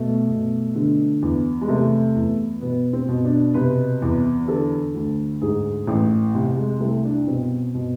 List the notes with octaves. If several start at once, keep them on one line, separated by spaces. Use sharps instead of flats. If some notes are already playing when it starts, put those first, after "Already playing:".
Already playing: B2 A3
B2
D3
E2
G#3
C3 A3
E2
B2 B3
C4
B2
D4
C3 B4
E2
D3 A4
D2
G#2 G#4
A1
C3
G#3
C2 A3
D4
B2 C4
B2